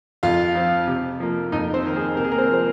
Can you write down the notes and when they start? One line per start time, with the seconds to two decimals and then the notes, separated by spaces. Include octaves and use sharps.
0.23 F2 F4 F5
0.55 F3 C4
0.87 C3
1.20 F3 A#3
1.52 F2 D#4 D#5
1.74 C4 C5
1.85 D#3 A#3 A#4
1.96 G#4
2.17 C3 A#4
2.24 G#4
2.32 A#3 A#4
2.38 C4 C5
2.50 F3 G#3 C5